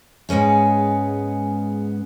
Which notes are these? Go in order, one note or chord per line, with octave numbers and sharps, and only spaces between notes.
G#2 G#3 B3 C#4 G#4